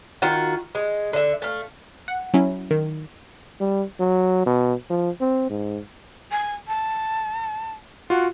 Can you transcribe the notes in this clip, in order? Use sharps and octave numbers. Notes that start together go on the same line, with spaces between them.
D#3 F4 F#4
G#3
D3 E5
A3 F5
F#5
F#3 C#4 E4
D#3
G3
F#3
B2
F3
C4
G#2
G#5
A5
F4 F#4 F#5